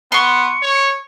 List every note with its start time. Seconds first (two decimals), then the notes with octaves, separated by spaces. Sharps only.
0.12 B3 C6 C#6 C#7
0.63 C#5